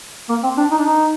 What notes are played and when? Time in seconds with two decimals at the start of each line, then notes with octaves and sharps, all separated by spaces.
0.29 A#3
0.43 C4
0.57 D4
0.71 D#4
0.78 D4
0.85 D#4